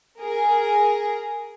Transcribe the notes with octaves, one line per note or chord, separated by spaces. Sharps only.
G#4 A#4